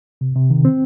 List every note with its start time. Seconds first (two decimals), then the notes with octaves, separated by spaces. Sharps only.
0.21 C3
0.35 C3
0.50 D#3
0.65 C4